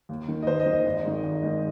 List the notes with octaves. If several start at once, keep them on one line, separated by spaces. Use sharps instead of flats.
D#2
D#3
D#5
D#2 C5
D#5
D#3
D#5
G#1
G#2 D#3
G#1
G#2 D#3